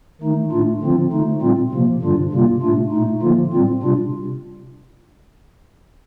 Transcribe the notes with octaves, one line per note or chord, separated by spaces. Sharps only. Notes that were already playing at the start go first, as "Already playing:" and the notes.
D#3 A3 D#4
A2 A3 D4 F4
D3 F3 C4 F4
D3 A3 D#4
A#2 G3 C4 F4
C3 F3 A#3
G2 D3 G3 D4 F4
C3 G3 A#3 F4
A2 A3 D4 F4
A#2 A3 D#4
D3 F3 A#3 F4
A2 G3 C4 F4
C3 G3 D4 F4